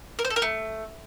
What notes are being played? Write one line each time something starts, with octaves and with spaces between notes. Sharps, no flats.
A#4
C5
A4
A#4
A3